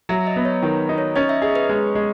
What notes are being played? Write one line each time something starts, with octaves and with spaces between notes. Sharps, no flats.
F#3 E5
D#5
B3
C#5
D#3 B4
D#4
C#5
C#4 D#5
E5
G#4 D#5
B4
G#3
G#3